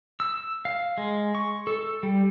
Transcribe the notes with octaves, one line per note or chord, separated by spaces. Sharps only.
E6
F5
G#3
C#6
A4
G3